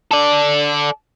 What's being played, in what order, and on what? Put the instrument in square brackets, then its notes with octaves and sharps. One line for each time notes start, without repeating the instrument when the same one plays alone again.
[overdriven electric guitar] A4 D5